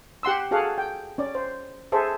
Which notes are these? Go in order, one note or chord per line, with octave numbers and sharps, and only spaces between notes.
G4 F#5 C6 E6
F#4 G#4 A4 F5 F#5
G5
C#4 D5
C5
G#4 A4 C5 E5